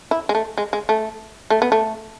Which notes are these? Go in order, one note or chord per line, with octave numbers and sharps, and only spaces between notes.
E4
G#3
A3
G#3
G#3
A3
A3
B3
A3